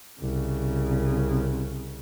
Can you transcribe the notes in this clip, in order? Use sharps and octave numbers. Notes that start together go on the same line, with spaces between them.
C2 C#3